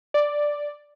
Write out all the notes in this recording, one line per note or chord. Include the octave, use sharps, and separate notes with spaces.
D5